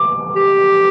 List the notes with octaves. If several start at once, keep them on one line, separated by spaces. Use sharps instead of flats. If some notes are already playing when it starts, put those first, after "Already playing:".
Already playing: D6
G4